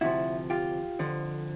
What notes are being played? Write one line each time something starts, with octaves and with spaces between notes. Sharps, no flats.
D2 C3 F3 E4 F#4
F4 G4
F2 D3 F3